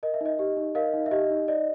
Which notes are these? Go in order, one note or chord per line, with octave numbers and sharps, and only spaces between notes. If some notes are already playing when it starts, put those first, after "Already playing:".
A#4 D#5
E5
D#4 D#5
G4
D#4
A#4 D#5 F5
D#4
E5
G4 D#5
D#4
D5 D#5